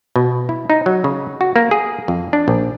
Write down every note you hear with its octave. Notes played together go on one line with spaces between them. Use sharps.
B2
E4
D#4
F#3
C#3
F#4
A#3
G#4
F2
D4
A#1